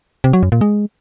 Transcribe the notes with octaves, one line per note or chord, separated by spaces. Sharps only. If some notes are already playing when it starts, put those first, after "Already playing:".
C3
F#3
F#2
A#2
G#3